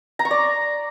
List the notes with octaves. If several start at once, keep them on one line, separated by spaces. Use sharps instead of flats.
A#5
C#6
D5